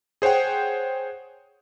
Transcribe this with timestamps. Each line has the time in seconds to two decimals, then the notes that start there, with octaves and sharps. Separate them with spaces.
0.22 G#4 C5 C#5 F#5 G5